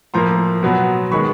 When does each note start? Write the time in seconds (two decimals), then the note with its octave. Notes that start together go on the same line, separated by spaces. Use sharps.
0.14 A2 F3 A#3 A#5 C6
0.63 B2 F#3 B3
1.12 D#3 G#3 B3 B5 C#6